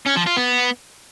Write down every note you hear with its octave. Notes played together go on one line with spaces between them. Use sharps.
C#4
F3
F4
B3